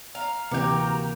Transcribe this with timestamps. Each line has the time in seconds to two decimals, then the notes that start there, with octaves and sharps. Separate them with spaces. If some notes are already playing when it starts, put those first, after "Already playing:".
0.15 F5 A#5
0.51 D2 C3 E3 A#3 F#4 G4 G5